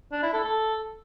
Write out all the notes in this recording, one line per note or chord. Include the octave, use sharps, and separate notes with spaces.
D4
E4
A4
A4